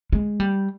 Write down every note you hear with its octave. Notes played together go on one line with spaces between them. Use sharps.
G#3
G3